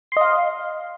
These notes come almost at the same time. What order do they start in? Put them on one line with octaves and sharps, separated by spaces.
C6 D#5 F5